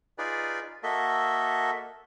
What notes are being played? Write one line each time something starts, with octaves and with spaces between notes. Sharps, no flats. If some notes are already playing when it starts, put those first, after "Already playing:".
D#4 F4 G#4 B4 D5
A#3 F#4 A4 D#5 E5